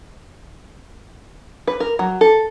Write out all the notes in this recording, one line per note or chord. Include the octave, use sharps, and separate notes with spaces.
B4
A#4
F#3
A4